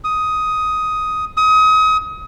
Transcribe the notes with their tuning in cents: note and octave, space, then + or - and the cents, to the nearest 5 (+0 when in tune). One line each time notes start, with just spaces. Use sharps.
D#6 +10
D#6 +30